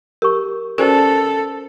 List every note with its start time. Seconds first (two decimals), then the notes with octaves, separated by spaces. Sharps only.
0.22 G4 A#4 C#6
0.78 C#4 F#4 A4 A#4 C5 D5 A5